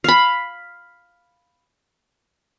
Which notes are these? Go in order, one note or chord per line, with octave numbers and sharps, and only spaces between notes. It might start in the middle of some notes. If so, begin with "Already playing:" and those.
F5 B5